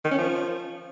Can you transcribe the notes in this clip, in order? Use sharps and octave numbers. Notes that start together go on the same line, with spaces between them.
D#3
C#4
F3